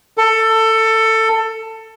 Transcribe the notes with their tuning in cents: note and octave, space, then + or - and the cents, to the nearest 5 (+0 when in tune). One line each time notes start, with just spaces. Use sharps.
A4 +20